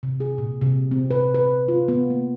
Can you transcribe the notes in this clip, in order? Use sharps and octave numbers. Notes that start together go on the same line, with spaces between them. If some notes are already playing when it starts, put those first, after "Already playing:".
C3
G#4
A#2
C3
C4
B4
B4
F4
B3
A#3